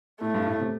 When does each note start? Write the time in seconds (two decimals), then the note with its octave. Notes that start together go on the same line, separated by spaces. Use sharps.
0.21 A2 A3
0.34 G2
0.46 A2
0.60 C3